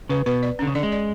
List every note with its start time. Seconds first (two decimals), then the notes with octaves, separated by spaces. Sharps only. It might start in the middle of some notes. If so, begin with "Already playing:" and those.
0.09 C#3 B4
0.26 B2 B4
0.43 D5
0.59 D3 C#4
0.67 C#3
0.75 D3 D5
0.83 G#3
0.92 D5